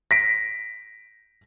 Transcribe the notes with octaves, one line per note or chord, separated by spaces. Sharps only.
A#6 B6 D7